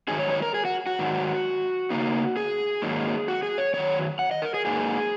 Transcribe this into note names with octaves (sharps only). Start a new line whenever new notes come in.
G#2 D#3 F#3 D#4 G#4
C#5
C#5
A#4
G#4
F#4
F#4
G#2 D#3 F#3 D#4
C#3 A#3 D#4
G#4
G#2 D#3 F#3 A#3 D#4
F#4
G#4
C#5
F#2 D#3 F#3 C#5
F#5
D#5
A#4
G#4
G#2 F#3 A#3 D#4 G#4